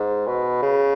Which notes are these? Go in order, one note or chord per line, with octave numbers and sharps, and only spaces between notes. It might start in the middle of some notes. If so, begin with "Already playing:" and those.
Already playing: G#2
B2
C#3